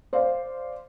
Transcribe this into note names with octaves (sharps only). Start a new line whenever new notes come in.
C5 D5 F5